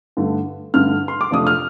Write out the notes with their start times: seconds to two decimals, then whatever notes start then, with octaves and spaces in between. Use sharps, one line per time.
0.17 G2 D3 A3
0.74 G2 D3 A3 F6
1.08 C6
1.21 D6
1.31 F2 C3 F3 A3 D4 D#6
1.47 F6